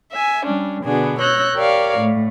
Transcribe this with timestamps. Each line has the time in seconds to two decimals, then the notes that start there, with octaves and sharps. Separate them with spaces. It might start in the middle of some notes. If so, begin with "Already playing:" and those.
0.12 E5 G#5
0.46 G3 C#4 D4
0.84 B2 D3 B3 D4 F#4 G#4
1.19 C#5 E6 F#6 G6 A#6
1.56 G4 A#4 C#5 D5 F5
1.99 A2 A3